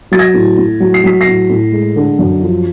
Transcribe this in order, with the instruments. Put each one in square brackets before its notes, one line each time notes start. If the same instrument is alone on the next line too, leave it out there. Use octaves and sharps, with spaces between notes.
[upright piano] F#3 A6
G#6 A#6
A2
A2
F#3
C7
F#3 B6
A#6 C7
A2
A2
G#3
D3
F#2
F3